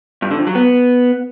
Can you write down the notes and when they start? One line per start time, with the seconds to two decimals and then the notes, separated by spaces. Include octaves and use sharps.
0.22 G2
0.30 D3
0.39 F2
0.47 F#3
0.55 B3